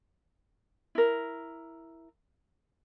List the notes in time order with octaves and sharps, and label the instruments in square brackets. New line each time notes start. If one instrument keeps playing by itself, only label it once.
[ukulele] E4 A#4